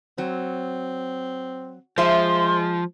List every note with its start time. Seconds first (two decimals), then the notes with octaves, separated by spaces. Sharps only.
0.18 F#3 C4
1.98 F3 G#3 C5 E5 C6